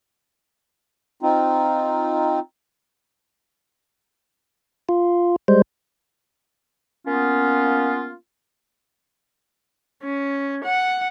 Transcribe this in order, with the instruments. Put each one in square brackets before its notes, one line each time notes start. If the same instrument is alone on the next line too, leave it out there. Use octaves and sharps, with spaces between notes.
[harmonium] C4 D#4 F4
[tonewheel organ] F4
G3 G#3 C5
[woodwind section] A#3 B3 C#4 F4
[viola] C#4
F#5